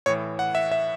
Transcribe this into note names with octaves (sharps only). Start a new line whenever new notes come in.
A2 E3 C#5
F#5
E5
E5